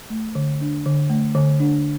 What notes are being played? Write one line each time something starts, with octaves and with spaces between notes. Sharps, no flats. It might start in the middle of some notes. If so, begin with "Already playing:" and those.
A3
D3
D4
D3
A3
D3
D4